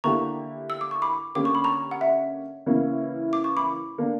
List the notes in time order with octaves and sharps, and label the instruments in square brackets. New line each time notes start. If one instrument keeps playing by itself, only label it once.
[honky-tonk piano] D3 A#3 E4 G4 [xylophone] A#5 C#6
[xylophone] E6
D6
C#6
B5 D6
[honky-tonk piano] D3 A#3 C#4 G4 [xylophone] D6
[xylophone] C#6
B5
A#5 C#6
F#5
E5
[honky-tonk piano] C#3 E3 A#3 C#4 E4
[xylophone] D6
C#6
B5 D6
[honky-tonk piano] D3 A#3 D4